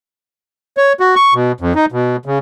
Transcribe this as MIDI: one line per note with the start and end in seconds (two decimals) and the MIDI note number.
0.77 0.93 73
1.00 1.15 66
1.16 1.34 85
1.34 1.52 47
1.61 1.73 41
1.75 1.86 63
1.92 2.16 47
2.26 2.39 49